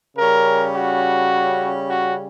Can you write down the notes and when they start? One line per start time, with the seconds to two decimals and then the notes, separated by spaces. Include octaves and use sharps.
0.17 C#3 G3 C#4 A#4
0.75 F#4
1.89 F#4